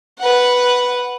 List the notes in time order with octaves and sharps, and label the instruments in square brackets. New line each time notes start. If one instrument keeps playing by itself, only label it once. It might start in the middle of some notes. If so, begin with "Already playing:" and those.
[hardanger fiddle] B4 F#5